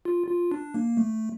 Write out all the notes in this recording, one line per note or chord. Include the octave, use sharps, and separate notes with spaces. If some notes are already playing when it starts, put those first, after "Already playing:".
F4
F4
D4
A#3
A3